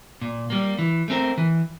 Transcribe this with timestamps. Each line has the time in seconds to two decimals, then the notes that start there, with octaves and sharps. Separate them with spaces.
0.21 A#2
0.50 G3 A#3
0.79 E3
1.08 A3 C4 G4 A#4
1.38 E3